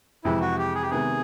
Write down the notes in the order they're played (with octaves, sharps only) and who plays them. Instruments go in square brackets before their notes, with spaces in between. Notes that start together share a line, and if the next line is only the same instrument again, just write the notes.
[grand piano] F2 C3 E3 G#3 [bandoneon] E4
[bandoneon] F#4
G4
G#4
G4
[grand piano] C3 D#3 G#3 B3 [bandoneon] G#4